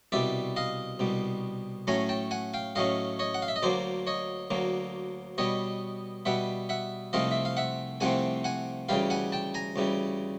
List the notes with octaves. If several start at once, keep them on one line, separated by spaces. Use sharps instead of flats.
C2 B2 G3 D5 E5
D#5 F5
C2 B2 G3
A2 F#3 A3 C#4 G#5 A#5
G5 A5
F#5 G#5
F5 G5
A2 F#3 A3 C#4 D#5 F5
C#5 D#5
F#5
F5
E5
D#5
D2 D3 F#3 A#3 C5 D5
C#5 D#5
D2 D3 F#3 A#3
B2 G3 B3 C#5 D#5
B2 G3 B3 E5 F#5
E5 F#5
C2 C3 F3 A3 C4 D#5 F5
E5
F5
E5 F#5
C2 C3 F3 A3 C4 F#5 G#5
F#5 G#5
D2 C#3 E3 G3 F5 G5
F#5 G#5
G5 A5
G#5 A#5
D2 C#3 E3 G3